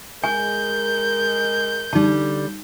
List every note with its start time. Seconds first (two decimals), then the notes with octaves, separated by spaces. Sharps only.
0.24 G#3 A#4 G#5 G6
1.93 D3 G3 D#4 A5